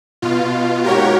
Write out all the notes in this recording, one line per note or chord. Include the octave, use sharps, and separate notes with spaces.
B2 F4
G#2 A#3 F#4 G4 A#4 C#5